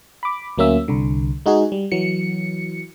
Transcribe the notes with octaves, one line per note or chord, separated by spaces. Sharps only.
B5 D6
D2 F#3 A#3 C#4 E5 E6
C2 D3
G#3 D#4 F#4 G#4
G3
E3 F#3 C#7